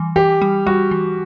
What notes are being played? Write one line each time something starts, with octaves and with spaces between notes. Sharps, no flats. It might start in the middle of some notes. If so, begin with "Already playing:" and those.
Already playing: E3 G3
E3 G4
G3
G3 F#4
E3